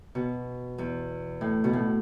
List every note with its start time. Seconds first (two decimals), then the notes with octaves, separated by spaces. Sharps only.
0.15 B2
0.78 E2
1.41 A2
1.64 B2
1.73 A2